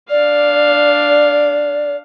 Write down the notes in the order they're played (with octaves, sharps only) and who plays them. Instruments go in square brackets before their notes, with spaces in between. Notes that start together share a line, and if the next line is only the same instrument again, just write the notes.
[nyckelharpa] D4 F5 [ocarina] D5